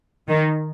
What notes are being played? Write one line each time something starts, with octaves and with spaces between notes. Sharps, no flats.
D#3